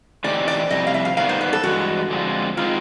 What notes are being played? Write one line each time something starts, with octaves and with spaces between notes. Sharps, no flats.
E3 A3 C4 D#4 G4 D5
D5
F2 C3 G3 D#5
F5
E5
F5
D#3 G3 B3 F5
C5
B4
A4
G2 E3 G#3 F#4
D3 F3 G#3 C4 F4
D#3 G#3 C4 F4